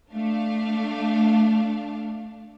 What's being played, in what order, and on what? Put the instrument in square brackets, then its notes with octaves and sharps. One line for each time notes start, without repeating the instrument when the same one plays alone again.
[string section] A3 D4 F5